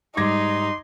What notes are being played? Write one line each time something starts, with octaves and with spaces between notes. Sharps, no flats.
G#2 G3 D#4 C6 D6 G#6 A#6